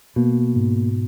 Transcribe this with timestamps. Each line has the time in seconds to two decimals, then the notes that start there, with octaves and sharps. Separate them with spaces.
0.16 B2 A#3
0.56 G#2